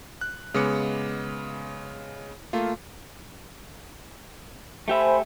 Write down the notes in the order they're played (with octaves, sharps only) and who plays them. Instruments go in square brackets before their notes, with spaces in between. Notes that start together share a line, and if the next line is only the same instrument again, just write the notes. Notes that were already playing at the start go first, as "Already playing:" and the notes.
[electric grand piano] F#6
C#3 G#3 B3 D6 C#7
A3 A#3 F4
[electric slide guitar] A3 G4 E5 [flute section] C5 G#5 B5